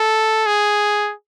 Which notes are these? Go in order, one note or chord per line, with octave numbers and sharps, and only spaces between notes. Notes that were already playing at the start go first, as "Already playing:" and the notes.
Already playing: A4
G#4